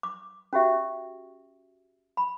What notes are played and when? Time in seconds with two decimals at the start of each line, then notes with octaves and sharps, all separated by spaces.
0.03 D6
0.53 C#4 F#4 G4 E5
2.17 B5